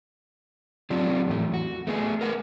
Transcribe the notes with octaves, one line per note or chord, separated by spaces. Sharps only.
F#3 C4 D4 F4 G4
E2 A2 A3
F#4
A3 B3 G#4
A#4 B4 F#5